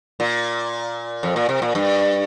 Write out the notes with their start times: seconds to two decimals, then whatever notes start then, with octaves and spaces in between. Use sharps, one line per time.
0.20 A#2
1.23 F2
1.36 A#2
1.49 C3
1.62 A#2
1.75 G2